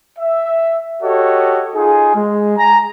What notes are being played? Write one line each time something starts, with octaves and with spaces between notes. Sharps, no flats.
E5
F#4 G4 A4 C#5 D#5
D#4 F4 G#4
G#3
G#5 A#5